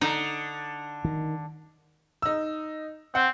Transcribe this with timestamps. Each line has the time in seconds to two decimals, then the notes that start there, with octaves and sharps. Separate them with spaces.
0.01 D3 D#4
1.05 D#3
2.22 D#4 E6
3.15 C4 F#5